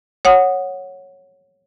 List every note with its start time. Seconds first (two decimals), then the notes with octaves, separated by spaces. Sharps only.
0.25 C#5 F#5 D#6